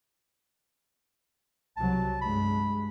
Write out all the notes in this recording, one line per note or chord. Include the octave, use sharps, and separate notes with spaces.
C2 C3 F#3 A5
G2 G#3 B5